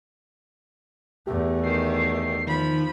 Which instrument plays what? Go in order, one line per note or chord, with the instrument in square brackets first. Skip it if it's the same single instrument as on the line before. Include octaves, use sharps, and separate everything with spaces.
[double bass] E2 A3 [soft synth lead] G4
[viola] D#3 G4 [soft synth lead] C7
[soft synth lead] D#3 [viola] F3 B5